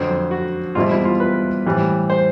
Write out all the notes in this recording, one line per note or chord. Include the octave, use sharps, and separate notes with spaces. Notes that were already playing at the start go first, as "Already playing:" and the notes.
Already playing: F2 D3 F#3 C5
F#4
E2 B2 G3 C4 E4 F4
E4
F4
B4
A2 E3 G3 C4
C5